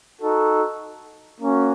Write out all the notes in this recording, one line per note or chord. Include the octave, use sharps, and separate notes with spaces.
D#4 F#4 A4
A#3 C#4 F#4